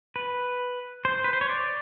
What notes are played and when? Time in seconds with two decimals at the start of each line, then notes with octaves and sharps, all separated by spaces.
0.16 B4
1.05 C5
1.24 B4
1.33 C5
1.41 C#5
1.49 D5